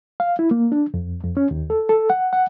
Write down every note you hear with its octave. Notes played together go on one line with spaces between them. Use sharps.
F5
E4
A#3
D4
F2
F2
C#4
D#2
A4
A4
F#5
F#5